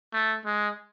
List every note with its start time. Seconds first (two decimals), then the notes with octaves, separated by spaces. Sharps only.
0.13 A3
0.45 G#3